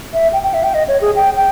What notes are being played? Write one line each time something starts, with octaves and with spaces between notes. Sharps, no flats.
E5
G5
G5
E5
G5
D#5
C#5
G#4
G5
G5